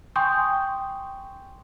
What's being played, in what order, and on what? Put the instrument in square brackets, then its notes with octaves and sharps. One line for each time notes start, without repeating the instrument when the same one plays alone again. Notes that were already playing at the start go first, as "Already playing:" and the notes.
[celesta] G5 G#5 C6 C#6 D#6 G6